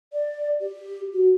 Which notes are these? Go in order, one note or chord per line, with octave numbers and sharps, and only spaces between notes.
D5
G4
F#4